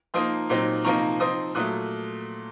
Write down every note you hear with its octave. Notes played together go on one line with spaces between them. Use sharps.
F3 A#3 D#4 C6 D#6
A#2 F#3 C4 D#4
C3 F3 A#3 D#4 A#5 C#6
F3 C4 D#4 C6 D#6
A#2 F#3 A3 D#6 F#6